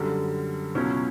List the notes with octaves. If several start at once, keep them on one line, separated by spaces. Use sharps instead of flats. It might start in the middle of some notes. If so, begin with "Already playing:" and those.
Already playing: F#2 D3 G3
C#2 B2 F#3 C#4 E4